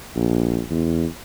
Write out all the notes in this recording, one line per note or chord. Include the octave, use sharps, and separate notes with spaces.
A#1
E2